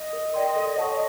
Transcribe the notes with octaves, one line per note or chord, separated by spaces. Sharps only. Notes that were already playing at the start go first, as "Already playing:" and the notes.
Already playing: D#5
A#4
D5 G5 C6
A4
C#5 F#5 A5 C#6